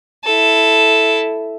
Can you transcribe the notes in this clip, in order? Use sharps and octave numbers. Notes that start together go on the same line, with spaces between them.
E4 A4